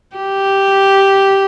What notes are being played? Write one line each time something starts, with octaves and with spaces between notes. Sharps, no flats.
G4